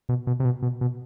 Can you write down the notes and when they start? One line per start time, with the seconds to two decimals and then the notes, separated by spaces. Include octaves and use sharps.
0.09 B2
0.27 B2
0.40 C3
0.45 B2
0.62 B2
0.81 B2